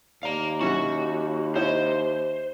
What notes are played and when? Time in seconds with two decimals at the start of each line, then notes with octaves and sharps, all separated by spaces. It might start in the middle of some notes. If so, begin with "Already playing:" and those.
0.23 D#2 D5 F5 A#5
0.61 F#3 C#4 E4 F#4
1.56 E4 C5 C#5 D#5